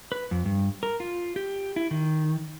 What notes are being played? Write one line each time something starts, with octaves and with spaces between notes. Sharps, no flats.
B4
F2
G2
A#4
F4
G4
E4
D#3